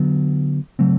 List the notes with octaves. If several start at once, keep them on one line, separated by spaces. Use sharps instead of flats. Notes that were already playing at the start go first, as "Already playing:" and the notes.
Already playing: D3 F#3 B3
C#3 F#3 A3 C4